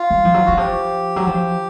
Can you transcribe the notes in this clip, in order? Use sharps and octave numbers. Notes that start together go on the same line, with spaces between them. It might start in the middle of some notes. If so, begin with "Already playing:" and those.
Already playing: F4
G3
F3
F#3
E3 F#4
F3 G4
F#3
F3